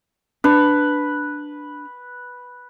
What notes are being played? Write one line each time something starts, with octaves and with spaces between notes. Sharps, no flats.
D4 B4